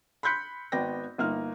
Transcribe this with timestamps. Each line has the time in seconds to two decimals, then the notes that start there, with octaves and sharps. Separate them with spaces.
0.23 B5 C6 F#6 G6 B6 C#7
0.72 G#1 B3 D5 G5 A#6
1.18 G1 A#3 D#4 F6